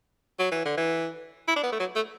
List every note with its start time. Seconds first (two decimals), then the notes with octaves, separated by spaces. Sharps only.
0.39 F#3
0.51 E3
0.65 D3
0.77 E3
1.48 E4
1.56 D4
1.63 B3
1.72 A3
1.80 F#3
1.95 A3